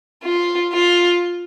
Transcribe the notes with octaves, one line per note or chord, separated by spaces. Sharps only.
F4
F4